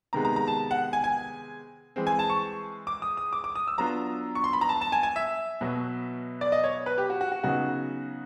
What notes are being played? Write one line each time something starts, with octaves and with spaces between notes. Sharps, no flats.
C3 D#3 G#3 B3 A#5
A#5
A#5
A5
F#5
G#5
G#5
E3 G#3 C4
G#5
A5
C#6
D6
D#6
D#6
D6
D6
D#6
E6
F#3 B3 D4 F4 A#5
C#6
C6
B5
A#5
A5
A5
G#5
G#5
E5
B2 F#3 B3
D5
D#5
C#5
B4
G4
F#4
F#4
F#4
C#3 F#3 B3 D#4 F#4